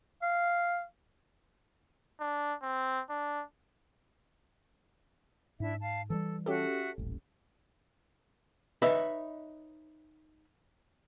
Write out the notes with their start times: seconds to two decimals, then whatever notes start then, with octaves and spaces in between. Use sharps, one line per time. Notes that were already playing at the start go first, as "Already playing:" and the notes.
0.22 F5
2.20 D4
2.62 C4
3.10 D4
5.60 G#2 D4 E4 E5
5.81 F5 A5
6.10 E3 F3 G3 A4
6.46 C#4 F#4 G4 A4 E5
6.98 D#1 A1
8.82 D#4 B4 C#5 D#5 E5